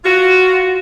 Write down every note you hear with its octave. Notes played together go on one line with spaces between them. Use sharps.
F4 F#4